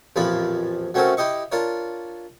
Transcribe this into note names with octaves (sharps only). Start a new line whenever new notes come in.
A1 F2 A#2 F3 F5 B5
F#3 A3 C4 C#4 F#4 A#4
E4 G4 D#5 C#6
D4 F4 A#4 C#5